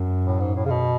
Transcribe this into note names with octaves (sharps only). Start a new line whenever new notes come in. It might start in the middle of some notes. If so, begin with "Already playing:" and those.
Already playing: F#2
A2
G#2
A2
C#3
B2